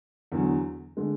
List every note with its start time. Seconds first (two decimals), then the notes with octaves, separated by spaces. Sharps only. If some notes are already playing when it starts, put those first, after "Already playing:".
0.32 E2 D3 F#3
0.97 D3 G#3